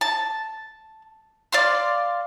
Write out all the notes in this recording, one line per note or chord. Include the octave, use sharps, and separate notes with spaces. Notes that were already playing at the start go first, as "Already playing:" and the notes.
A5
D5 F5 C6